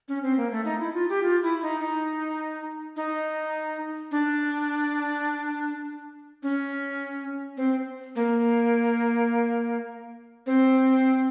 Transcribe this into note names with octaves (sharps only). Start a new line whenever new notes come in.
C#4
C4
A#3
A3
D#4
E4
F4
G4
F4
E4
D#4
D#4
D#4
D4
C#4
C4
A#3
C4